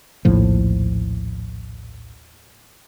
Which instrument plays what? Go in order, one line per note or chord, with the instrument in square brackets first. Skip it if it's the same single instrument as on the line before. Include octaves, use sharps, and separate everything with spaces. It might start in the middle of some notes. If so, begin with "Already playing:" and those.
[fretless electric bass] A#1 D#2 A2 F3